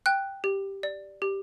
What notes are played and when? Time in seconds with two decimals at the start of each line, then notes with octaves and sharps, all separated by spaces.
0.06 G5 F#6
0.44 G4
0.83 D5
1.22 G4